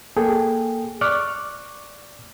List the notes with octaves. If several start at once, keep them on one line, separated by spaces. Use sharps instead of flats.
A#3 G#4 A4 G5
D5 C#6 D6 F6 F#6